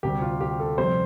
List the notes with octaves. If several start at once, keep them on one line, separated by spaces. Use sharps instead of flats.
D2 C3 G3 G4
F4
G4
A4
F2 C3 G3 C4 C5